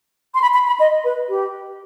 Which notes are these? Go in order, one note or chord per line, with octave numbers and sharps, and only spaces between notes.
C6
B5
B5
B5
D#5
B4
G4